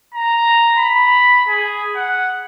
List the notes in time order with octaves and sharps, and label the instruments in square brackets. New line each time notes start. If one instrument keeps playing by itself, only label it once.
[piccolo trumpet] A#5
B5
G#4
F#5